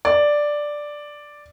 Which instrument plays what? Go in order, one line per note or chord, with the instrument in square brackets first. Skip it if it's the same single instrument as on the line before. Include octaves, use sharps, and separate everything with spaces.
[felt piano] D5